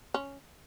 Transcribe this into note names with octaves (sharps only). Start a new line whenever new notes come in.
C#4